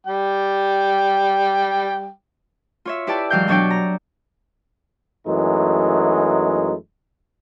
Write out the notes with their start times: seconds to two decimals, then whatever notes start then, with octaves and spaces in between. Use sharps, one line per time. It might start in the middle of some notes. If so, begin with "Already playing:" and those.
0.07 G3 G5
2.85 F4 C#5 E5
3.07 E4 G4 B4 D5 A5
3.30 G#2 E3 F#3 F5 G5 G6
3.48 B2 F#3 D4 C#5 D5 G5
3.70 A#5
5.27 F#2 E3 G#3 A3 D#4